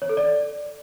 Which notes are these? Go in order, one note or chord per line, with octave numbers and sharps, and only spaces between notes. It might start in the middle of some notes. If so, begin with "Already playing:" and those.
C#5
A4
D5